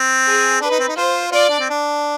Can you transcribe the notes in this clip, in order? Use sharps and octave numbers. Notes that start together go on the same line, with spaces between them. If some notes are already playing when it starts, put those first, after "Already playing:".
Already playing: C4
G#4
D4 B4
D#4
C4
D#4
F4 C5
F4 D5
D4
C4
D4